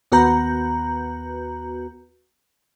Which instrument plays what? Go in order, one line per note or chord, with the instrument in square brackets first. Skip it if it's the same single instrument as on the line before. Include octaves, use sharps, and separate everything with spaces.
[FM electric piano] D#2 B3 F#4 B4 A#5 G6